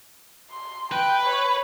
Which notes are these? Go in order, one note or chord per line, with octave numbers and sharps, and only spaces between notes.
C6
B4 G5
C#5